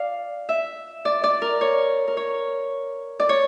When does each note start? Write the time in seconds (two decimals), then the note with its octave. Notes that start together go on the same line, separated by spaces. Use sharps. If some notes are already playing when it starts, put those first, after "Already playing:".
Already playing: D5 F5
0.49 E5
1.05 D5
1.24 D5
1.42 A#4
1.61 C#5
2.08 A#4
2.17 C#5
3.20 D5
3.29 C#5